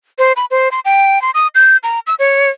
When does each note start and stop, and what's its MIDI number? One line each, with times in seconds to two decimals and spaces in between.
0.19 0.33 72
0.36 0.45 83
0.51 0.69 72
0.72 0.80 84
0.85 1.21 79
1.22 1.31 84
1.35 1.47 87
1.55 1.77 91
1.83 2.00 82
2.07 2.15 88
2.19 2.49 73